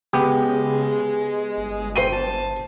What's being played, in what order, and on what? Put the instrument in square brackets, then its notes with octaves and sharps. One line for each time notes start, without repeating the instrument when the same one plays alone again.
[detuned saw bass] C#3 [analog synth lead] G#3 [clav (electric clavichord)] B3 G4
[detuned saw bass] G1
[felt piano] C5 C7 D#7 [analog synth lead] G5
[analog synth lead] A5